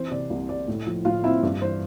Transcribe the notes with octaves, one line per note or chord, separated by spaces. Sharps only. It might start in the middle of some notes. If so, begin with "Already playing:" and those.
Already playing: E3 C4 C5
C3 D5
C2
G3 D5
A2
F3
A2 F4 F5
C4 E4 E5
G2 D5
E3 C5